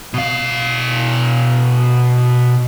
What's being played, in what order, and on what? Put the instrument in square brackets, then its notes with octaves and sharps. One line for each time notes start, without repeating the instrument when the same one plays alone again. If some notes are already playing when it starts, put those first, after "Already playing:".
[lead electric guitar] B2 F5